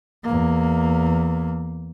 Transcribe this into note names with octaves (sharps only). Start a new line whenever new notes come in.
E2 A#3